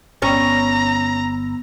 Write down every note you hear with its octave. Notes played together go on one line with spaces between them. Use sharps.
G1 B3 C#4 A#5 E6